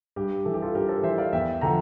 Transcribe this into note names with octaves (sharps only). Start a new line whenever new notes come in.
G2 G4
E3 A4
G4
F4 A4
G2 G4 A#4
A4 C5
E3 C5 E5
D5 F5
E2 E5 G5
D3 F3 G5 A#5